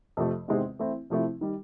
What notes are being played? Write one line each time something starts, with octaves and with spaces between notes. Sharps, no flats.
F2 C3 F3 A3
E2 C3 D#3 G#3 C4
E3 A3 C4 E4
C3 F3 A3 C4 E4
D#3 G3